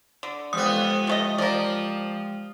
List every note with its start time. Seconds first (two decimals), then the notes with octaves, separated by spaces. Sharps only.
0.23 D3
0.53 F2 G#3 B3 G4 G5 D#6
1.07 F3 A3 D#5
1.38 F3 A#4 D5